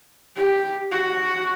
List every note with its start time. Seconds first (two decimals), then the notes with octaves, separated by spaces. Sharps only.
0.36 G4
0.91 F#4